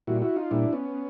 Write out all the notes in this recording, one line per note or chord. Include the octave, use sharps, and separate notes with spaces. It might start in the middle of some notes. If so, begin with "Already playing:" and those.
A#2 G3 E4 F#4
E4 F#4
D#4 F4
A#2 G3 D4 E4
B3 C#4